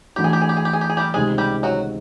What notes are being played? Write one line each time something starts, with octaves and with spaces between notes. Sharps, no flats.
E3 A3 D4 F#4 G4
G#4
G4
G#4
G4
G#4
G4
G#4
G4
G#4
G3 G4
C#2 C3 D#3 G#3 G#4
G3 G4
F#3 F#4